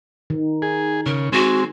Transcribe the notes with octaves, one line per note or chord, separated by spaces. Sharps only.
D#3
G#4
C#3 A#4
G#3 C4 F#4